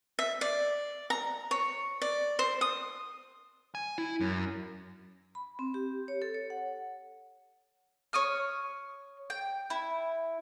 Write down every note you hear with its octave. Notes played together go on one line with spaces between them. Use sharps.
E5
D5
A#5
C#5
D5
C5
D#6
G#5
E4
F#2
B5
C4
G4
C#5
A4
C#5
F#5
C#5 C#6 D#6 F6
G5
E4